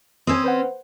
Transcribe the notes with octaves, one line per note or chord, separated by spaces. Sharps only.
C4 C#4 D#6 E6 G#6
B4 C5 F#5